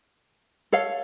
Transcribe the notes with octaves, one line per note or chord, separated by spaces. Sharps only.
A4 C#5 F5